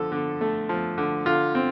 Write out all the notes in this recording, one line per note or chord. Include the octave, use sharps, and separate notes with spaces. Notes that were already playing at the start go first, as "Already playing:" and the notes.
Already playing: D3 F3 A4
D3
A3
F3
D3
D3 F4
C4